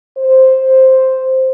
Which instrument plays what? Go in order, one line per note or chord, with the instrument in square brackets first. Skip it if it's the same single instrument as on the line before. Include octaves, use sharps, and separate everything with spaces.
[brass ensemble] C5